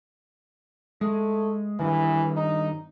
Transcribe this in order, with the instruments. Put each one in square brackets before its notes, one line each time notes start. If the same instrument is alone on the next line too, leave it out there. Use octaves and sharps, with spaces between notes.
[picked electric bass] G#3 [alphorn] A3
[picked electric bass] G2 D#3 [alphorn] E3
[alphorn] D#4